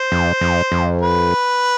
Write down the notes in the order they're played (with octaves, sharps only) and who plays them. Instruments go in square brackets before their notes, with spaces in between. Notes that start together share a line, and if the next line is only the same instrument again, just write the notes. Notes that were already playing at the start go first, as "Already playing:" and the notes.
Already playing: [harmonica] C5
[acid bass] F2
F2
F2
[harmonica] B4